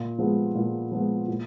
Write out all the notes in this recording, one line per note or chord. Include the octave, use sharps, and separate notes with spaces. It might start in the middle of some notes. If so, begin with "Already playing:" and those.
Already playing: A#2
F3 G#3 B3
A#2
F3 G#3 B3
A#2